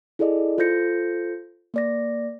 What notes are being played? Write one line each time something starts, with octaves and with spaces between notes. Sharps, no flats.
E4 G#4 A4 D5 D#5
F4 A4 C5 G6 A#6 C#7
A#3 D5 A#6